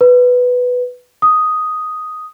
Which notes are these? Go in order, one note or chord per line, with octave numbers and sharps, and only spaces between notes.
B4
D#6